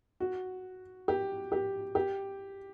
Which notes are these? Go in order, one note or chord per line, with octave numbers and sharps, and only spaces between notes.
F#4
G4
G4
G4